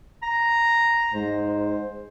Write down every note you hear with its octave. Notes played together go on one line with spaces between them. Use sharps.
A#5
G#2 C5